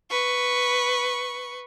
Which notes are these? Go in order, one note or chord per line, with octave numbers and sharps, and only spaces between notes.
B4 C#6